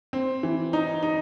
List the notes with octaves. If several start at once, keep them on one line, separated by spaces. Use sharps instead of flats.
C4
E3
D#4
D#4